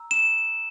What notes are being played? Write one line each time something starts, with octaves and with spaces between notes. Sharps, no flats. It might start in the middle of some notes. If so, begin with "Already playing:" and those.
Already playing: A#5 E6
E7